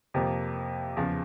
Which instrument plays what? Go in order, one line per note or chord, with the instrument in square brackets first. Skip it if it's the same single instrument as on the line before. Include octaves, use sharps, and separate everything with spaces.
[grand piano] F2 C3 F3 A#3
E2 C#3 F3